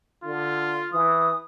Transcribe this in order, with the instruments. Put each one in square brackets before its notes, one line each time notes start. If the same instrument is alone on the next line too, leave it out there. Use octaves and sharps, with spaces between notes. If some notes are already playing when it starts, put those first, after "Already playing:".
[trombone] D3 [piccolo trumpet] F4
[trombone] E3 [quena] D#6